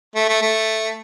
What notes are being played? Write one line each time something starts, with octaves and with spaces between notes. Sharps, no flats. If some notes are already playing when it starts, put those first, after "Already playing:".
A3
A3
A3